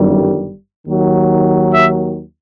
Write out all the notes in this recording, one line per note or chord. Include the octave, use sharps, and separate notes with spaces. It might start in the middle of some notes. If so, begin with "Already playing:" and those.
Already playing: G1 F#2 D#3 G3
D#2 D#3 F#3
E5